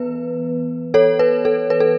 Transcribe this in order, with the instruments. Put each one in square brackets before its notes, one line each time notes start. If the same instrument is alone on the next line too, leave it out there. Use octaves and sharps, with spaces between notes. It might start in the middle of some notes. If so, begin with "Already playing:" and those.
Already playing: [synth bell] E3 B3 B4
A4 C#5
B4
A4
B4
A4